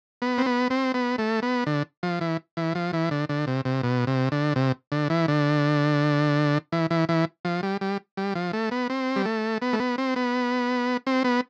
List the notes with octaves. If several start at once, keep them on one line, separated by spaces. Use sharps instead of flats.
B3
C4
B3
C4
B3
A3
B3
D3
F3
E3
E3
F3
E3
D3
D3
C3
C3
B2
C3
D3
C3
D3
E3
D3
E3
E3
E3
F3
G3
G3
G3
F3
A3
B3
C4
G3
A3
B3
A3
B3
C4
B3
C4
B3